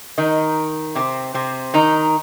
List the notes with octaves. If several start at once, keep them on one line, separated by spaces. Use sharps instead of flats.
D#3 D#4
C3 C4
C3 C4
D#3 D#4